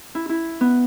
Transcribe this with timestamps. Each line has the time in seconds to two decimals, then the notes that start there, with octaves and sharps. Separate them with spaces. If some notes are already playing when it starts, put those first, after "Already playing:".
0.15 E4
0.29 E4
0.61 B3